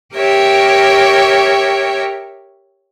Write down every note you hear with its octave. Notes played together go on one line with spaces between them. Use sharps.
G4 A#4 C#5 E5 G5